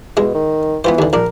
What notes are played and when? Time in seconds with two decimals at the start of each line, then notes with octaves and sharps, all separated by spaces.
0.17 B2 G#3 E4
0.35 D#3
0.84 E3 B3 F4 C5
0.99 D#2 D3
1.13 A#1 D4 A#4